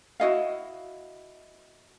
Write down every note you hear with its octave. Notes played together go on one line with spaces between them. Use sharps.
E4 F#4 D#5 F5